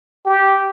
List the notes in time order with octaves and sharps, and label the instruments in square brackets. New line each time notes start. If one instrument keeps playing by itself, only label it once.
[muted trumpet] G4